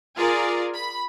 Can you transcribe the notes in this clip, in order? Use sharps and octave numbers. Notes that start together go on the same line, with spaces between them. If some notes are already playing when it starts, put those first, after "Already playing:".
F4 G#4 A#4 D5
B5